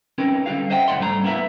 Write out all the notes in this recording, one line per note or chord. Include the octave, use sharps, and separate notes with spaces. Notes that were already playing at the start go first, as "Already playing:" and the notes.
C4 C#4 D#4 G4 A#4 B4
D3 G3 F#4 F5
C5 D#5 E5 F#5 G5
D2 A2 D#4 D5 F#5 C6
G#2 G3 A3 D4 E4 A#5
A#3 B3 D4 E4 A#4 E5